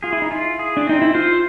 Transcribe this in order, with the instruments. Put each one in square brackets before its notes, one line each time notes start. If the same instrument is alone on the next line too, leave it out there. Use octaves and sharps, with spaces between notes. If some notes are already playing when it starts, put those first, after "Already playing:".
[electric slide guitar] F4 [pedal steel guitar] G#4
[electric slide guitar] E4
D#4
[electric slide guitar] E4 [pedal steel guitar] F4
[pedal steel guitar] G#4
[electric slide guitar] D4
[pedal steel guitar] C4 [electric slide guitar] D#4
[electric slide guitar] E4
[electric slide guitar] F4 [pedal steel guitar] C5